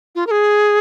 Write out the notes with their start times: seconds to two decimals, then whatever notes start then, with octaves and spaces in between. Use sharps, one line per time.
0.15 F4
0.27 A#4
0.31 G#4